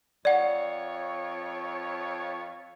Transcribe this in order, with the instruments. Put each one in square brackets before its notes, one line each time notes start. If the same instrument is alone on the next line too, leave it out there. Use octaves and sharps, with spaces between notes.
[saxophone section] F2 C#5 [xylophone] D5 F#5